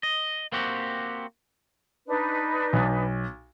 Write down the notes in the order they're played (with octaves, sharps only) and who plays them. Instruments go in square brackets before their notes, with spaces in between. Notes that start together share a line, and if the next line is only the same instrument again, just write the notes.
[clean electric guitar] D#5
A#3 C4 F#4 G4
[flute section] D4 D#4 B4
[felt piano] B1